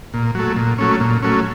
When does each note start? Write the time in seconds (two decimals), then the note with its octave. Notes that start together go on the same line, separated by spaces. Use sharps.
0.14 A#2
0.35 F#3 A3
0.56 A#2
0.78 F#3 A3 C#4
1.00 A#2
1.22 F#3 A3 C#4